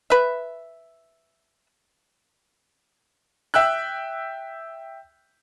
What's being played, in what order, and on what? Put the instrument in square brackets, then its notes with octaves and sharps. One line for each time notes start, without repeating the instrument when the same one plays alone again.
[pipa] B4 E5
[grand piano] E5 G5 E6 F#6